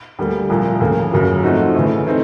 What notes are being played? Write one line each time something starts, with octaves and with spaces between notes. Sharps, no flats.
D2 D3 G3 A#3
C2 A#2 F3
D2 C#3 F3 A#3
F#2 C#3 F#3 A#3
F3 A3 C4 D#4 F#4
C#3 E3 A3
E3 A3 C4 D#4